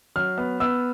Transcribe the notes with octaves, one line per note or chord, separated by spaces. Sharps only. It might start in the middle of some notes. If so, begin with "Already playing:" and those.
F#3 F6
B3
B3 E6